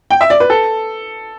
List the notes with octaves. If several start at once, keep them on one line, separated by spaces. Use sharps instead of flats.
G5
E5
D5
B4
A4